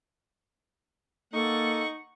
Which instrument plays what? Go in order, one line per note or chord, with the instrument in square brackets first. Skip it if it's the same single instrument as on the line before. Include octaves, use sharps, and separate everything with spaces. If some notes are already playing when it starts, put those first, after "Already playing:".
[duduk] A#3 [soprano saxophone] D#4 [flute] A4 [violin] F#5 C#6